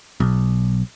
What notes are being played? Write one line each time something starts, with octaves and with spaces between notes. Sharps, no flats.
B1